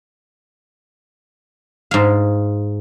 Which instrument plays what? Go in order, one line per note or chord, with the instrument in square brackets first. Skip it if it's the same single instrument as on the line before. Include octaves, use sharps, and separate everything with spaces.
[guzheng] G#2 F5